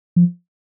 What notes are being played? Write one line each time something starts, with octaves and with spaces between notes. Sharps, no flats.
F3